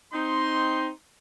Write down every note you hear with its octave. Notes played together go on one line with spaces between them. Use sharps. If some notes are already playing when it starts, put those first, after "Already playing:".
C4 D#4 C6